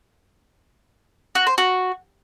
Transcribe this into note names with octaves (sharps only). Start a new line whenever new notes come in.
F#4
C5
F#4